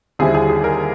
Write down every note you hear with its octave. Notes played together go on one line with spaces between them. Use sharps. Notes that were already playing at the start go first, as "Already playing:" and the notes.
D#2 D3 G3 C4 E4 G#4
G#4
G#4
A#4